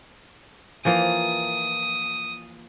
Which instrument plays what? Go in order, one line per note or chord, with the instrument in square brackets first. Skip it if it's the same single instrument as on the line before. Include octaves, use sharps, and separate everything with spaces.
[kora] E3 F3 A#3 [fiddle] D#6